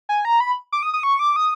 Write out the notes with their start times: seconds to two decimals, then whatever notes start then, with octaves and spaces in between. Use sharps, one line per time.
0.09 G#5
0.25 A#5
0.40 B5
0.72 D6
0.83 D#6
0.94 D#6
1.03 C#6
1.19 D6
1.36 D#6